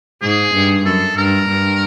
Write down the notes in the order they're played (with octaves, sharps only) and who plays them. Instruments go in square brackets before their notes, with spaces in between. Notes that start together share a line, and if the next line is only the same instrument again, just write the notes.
[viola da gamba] G#2 [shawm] G#4
[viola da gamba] G2
[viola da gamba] F#2 [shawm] A4
[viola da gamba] G2 [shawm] A#4
[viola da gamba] G2